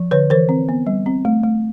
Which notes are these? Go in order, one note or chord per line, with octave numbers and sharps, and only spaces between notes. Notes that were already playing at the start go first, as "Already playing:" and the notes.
Already playing: F3
D3 B4 C#5
E3 A#4 C5
C4
B3
G3
C4
A3
A3